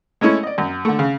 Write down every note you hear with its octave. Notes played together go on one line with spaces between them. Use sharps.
G#3 A3 C#4 E4
D5 D#5
F#2
D3 A3
C#3